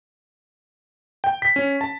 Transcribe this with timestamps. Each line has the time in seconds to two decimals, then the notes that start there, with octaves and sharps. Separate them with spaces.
1.24 G5
1.42 B6
1.56 C#4
1.81 A5